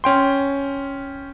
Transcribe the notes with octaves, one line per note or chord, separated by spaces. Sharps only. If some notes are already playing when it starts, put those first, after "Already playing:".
C#4 G5 C6